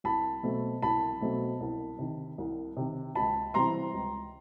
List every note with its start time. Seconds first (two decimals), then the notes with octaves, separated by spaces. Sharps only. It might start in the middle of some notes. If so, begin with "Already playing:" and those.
0.04 C2 A5 B5
0.43 B2 F#3 A3 C4
0.82 C2 A5 B5
1.21 B2 F#3 A3 C4
1.61 C2
1.99 C3 D#3
2.38 C2
2.77 C3 D#3
3.15 C#2 A5 B5
3.54 C3 E3 G3 C4 A#5 C6
3.94 C#2